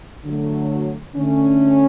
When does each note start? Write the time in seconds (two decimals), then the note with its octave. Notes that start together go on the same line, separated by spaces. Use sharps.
0.25 D3 F#3 A3
1.16 D3 A3 C#4